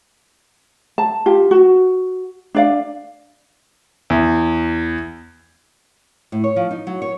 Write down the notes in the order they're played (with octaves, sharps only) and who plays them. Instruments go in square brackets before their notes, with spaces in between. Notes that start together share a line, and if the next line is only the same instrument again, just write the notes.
[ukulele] A5
F4 G4
F#4
D4 D5 F5
[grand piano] E2
[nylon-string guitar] A2
C#5
F3
D#4
F#3
C#5